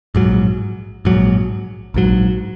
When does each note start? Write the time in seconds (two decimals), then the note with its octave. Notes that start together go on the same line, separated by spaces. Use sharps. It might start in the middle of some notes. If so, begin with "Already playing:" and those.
0.15 A#1 G#2 F#3
1.05 A#1 G#2 F#3
1.94 A#1 G#2 F#3